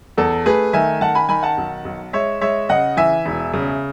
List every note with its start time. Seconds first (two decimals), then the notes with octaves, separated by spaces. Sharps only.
0.17 E2 A4
0.46 A3 G#4 B4
0.73 D#3 E5 G#5
1.01 D#3 F#5 A5
1.15 G#5 B5
1.29 D#3 G#5 B5
1.43 F#5 A5
1.58 B1
1.85 B1
2.13 G#3 C#5 E5
2.41 G#3 C#5 E5
2.69 C#3 D#5 F#5
2.97 E3 E5 G#5
3.26 E1
3.54 C#3